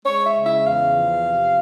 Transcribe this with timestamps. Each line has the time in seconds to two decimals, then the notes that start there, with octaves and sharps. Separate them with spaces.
0.05 G#3 C#5
0.24 E5
0.34 C#3
0.45 E5
0.65 E2 F5
0.95 F3
1.25 C3